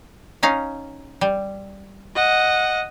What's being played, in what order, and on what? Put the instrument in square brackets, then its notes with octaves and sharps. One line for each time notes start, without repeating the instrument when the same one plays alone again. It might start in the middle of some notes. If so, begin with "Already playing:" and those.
[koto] C#4 D#4 F5
G3
[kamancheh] D#5 F#5